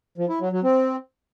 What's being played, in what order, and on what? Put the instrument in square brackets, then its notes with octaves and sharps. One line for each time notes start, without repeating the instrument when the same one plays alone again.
[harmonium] F3
E4
F#3
F#3
C4